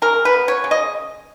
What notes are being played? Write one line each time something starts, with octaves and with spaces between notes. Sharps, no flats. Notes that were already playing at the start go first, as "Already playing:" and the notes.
C#3 A#4
B4
B3
C#5
C#3
D#5